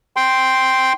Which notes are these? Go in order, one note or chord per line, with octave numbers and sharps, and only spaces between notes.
G5 C6